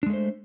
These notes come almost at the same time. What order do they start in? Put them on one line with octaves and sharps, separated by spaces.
D4 G#3 A3 C5